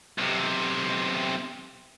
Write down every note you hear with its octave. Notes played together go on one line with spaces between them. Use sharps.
B1 C3